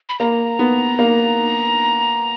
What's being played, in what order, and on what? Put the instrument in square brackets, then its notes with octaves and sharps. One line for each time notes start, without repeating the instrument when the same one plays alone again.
[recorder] B5
[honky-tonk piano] A#3 [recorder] A#5
[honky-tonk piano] B3
A#3